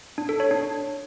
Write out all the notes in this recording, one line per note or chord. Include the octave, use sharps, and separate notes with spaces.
D4
A4
C#5
D4